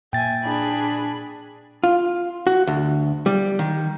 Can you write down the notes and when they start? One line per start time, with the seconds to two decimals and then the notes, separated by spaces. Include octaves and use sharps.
0.13 A#2 E5 G5 G#5 A6
0.44 D4 G#4 B5
1.84 F4
2.47 F#4
2.67 D2
3.26 G3
3.59 D#3